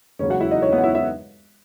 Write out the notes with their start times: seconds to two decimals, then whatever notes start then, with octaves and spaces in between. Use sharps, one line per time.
0.19 E1 D#2 C#3 F#3 C#4 C#5
0.30 F#4 F#5
0.40 E4 E5
0.51 D#4 D#5
0.62 C#4 C#5
0.73 B3 B4
0.78 F#5
0.83 E4 E5
0.94 E4 E5